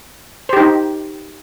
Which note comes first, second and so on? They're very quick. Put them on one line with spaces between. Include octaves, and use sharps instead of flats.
C5 G4 D#4